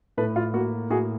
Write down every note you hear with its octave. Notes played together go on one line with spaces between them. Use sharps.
A2 A4 B4
F4
A#3 F#4
A2 F#4 G#4